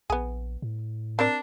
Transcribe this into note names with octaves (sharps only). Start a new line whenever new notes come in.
A#1 B3 G#4
A2
C4 D4 A#4 D5